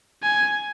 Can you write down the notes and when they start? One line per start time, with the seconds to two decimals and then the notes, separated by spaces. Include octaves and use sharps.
0.23 G#5